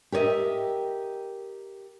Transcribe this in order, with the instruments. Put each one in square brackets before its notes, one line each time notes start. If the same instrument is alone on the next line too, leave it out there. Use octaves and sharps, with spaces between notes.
[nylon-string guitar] G4 A#4 C#5 D#5 E5